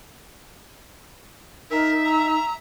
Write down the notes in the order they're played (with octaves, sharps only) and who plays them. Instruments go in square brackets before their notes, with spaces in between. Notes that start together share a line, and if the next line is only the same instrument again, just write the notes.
[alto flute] D#4 [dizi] A#4 [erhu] E5
[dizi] A#5